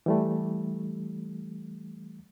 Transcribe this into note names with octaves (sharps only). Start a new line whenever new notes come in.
E3 G3 A3